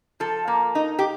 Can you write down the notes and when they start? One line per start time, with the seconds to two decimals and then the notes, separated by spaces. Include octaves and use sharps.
0.20 F3 A4
0.48 A#3
0.75 D#4
0.99 G4